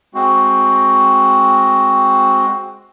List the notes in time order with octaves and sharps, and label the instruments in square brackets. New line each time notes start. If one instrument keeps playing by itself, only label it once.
[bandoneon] G#3 C4 F#4